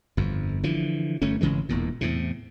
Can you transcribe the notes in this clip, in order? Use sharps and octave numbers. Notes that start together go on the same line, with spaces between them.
G1 F2
D3 E3 F3
G1 G2 A3 C#4
G#1 C#3 E3 G#3
E1 E2 A#2
E2 A2 C3